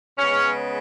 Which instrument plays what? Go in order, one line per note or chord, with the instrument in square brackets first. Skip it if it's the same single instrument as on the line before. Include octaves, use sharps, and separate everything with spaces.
[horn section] C#3 G#3 B3 C#4